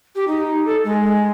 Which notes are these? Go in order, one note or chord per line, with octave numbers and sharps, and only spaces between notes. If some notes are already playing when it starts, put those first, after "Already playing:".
G4
D#4
A4
G#3